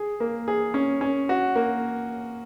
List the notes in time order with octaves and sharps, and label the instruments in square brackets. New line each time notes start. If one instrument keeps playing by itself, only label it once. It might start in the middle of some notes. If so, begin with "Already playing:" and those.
Already playing: [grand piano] G#4
A#3
G#4
C#4
C#4
F#4
A#3